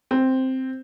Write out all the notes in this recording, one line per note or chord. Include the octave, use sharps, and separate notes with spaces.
C4